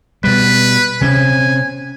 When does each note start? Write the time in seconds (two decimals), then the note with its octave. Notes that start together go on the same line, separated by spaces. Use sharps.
0.24 B2 G3 B4
1.01 C3 C4 C#4 G#5